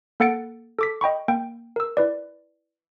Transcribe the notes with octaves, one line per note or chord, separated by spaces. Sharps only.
A#3 A4 F#5 A6 C#7 D7
A4 D6 B6
D#5 G5 B5 C#6
A#3 G5
A#4 E6
E4 B4 D5